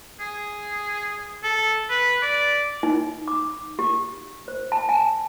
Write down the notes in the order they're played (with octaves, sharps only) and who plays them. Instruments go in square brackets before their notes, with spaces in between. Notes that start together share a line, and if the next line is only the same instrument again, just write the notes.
[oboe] G#4
A4
B4
D5
[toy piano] D#4
D6
G4
C5
A5
G#5